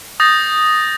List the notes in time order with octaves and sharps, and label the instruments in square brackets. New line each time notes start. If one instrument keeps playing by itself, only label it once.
[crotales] D#6 G6 A6 A#6